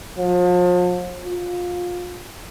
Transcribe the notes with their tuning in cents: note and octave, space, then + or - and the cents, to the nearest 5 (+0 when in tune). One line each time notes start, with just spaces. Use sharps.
F3 +40
F4 +25